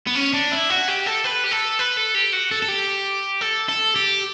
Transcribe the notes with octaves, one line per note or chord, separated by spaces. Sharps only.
B3
C#4
D4
E4
F#4
G4
A4
B4
G4
A4
B4
A4
G4
F#4
A4
A4
G4
A4
A4
G4